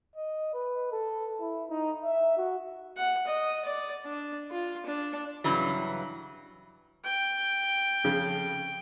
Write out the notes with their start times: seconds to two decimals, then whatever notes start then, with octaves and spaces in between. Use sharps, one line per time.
0.16 D#5
0.54 B4
0.92 A4
1.41 E4
1.70 D#4
2.04 E5
2.37 F#4
2.97 F#5
3.27 D#5
3.65 D5
4.05 D4
4.51 F4
4.86 D4
5.44 G2 C#3 E3 F#3
7.04 G5
8.04 F2 C#3